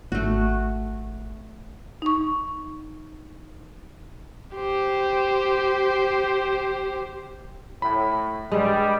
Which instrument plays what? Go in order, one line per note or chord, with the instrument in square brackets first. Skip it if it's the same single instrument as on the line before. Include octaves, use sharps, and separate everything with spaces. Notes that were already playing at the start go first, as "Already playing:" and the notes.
[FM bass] G#1 [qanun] A3 F#4
[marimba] D#4 C#6
[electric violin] G4 C5
[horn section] A2 [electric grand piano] B5
[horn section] G2 G3 [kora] G#3